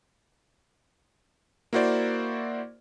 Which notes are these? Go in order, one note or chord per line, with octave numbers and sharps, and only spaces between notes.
A#3 E4 F#4 C5 D5